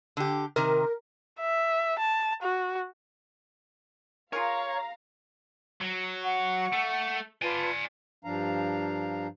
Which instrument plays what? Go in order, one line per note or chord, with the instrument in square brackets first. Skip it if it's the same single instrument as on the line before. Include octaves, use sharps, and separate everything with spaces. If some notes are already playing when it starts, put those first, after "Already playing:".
[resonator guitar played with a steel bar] D3 G4
[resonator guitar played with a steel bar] C3 D#3 [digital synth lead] A#4
[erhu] E5
A5
F#4
[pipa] F4 G#4 A#4 [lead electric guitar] C#5 [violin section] F5 A#5
[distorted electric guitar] F#3
[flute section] F#5 C#6
[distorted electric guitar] A3
[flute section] F4 B4 A5 [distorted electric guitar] D5 G#5
[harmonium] G2 F3 D4 F5 A#5